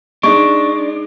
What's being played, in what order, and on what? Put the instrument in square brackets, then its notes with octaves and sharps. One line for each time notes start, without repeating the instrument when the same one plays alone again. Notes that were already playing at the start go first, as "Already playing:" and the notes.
[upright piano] G#3 D#4 [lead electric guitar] D4 [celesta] C#6